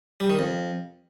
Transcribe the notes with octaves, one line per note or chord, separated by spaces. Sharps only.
G3
D#3
F2